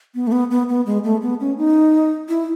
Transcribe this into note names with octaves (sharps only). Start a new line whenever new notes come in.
B3
A3
B3
B3
B3
G#3
A3
B3
C#4
D#4
E4